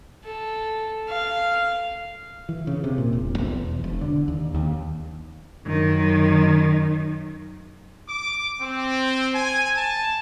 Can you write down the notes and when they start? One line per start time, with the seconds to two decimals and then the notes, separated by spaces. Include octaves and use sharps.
0.24 A4
1.09 F5
2.49 E3
2.67 C#3
2.84 C3
2.98 A#2
3.13 E1
3.38 B1
3.57 E2
3.84 E1
4.01 D3
4.28 D#2
4.54 D#2
5.67 F#2 D#3
8.07 D6
8.61 C4
9.33 G#5
9.76 A5